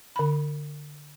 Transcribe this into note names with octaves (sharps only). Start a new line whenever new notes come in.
D3 B5